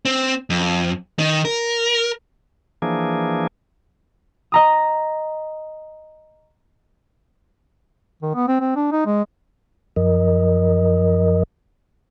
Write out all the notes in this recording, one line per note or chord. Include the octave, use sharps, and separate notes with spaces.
C4
F2
D#3
A#4
E3 F3 A#3 D4 G#4
D#5 A#5 D#6
D#3
B3
C4
C4
D4
D#4
G#3
F#2 F3 A#4 D#5